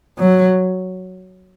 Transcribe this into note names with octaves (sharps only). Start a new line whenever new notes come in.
F#3